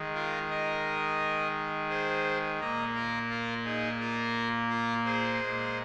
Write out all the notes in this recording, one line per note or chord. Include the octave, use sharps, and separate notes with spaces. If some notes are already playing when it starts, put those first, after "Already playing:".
Already playing: D#3 G#3
F4 A#4
A#4 D#5
G#4 C5
A#2 A#3 A#4 D#5
F4 A#4
F4 A#4
D#4 G#4
F4 A#4
F4 A#4
G#4 C5
A#2 G#3